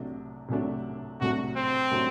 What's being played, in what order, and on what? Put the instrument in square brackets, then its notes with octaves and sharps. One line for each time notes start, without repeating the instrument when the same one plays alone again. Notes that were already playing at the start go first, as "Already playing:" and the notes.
Already playing: [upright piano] C2 C3 F#3 A3 D4
C2 C3 F#3 A3 D4
[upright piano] C2 C3 F#3 A3 D4 [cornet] F#4
[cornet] C4
[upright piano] C3 F#3 A3 D4